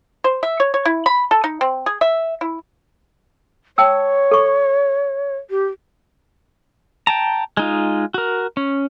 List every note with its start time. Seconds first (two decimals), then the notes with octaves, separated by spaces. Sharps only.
0.24 C5
0.43 E5
0.60 C#5
0.74 C#5
0.85 E4
1.06 B5
1.31 A4
1.44 D#4
1.61 C4
1.86 G#4
2.01 E5
2.41 E4
3.78 C#5 G5 A5 E6
4.31 A4 C#6
5.50 G4
7.07 G5 A5 A#5
7.57 G#3 D#4 F4
8.14 F#4 A#4
8.57 C#4